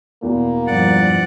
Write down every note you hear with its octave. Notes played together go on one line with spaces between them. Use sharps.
E2 B2 A#3
G2 F3 D5 F#5